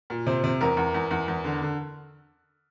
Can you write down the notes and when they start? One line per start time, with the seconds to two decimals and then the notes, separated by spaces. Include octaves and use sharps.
0.10 A#2
0.26 C3 C5
0.44 C3
0.61 E2 A#4
0.77 E2
0.94 E2
1.11 E2
1.28 E2
1.44 D3
1.62 D3